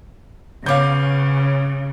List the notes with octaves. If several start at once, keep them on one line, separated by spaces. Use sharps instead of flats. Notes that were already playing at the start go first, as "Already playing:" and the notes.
C#3 B3 C#4 F5 D6 G6